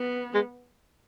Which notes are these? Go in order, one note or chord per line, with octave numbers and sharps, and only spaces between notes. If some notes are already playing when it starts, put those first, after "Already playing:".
Already playing: B3
G#3